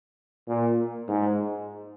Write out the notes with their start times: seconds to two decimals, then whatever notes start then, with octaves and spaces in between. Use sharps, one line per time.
0.48 A#2
1.08 G#2